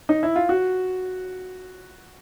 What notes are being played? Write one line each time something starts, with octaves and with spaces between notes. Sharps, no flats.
D#4
E4
F4
F#4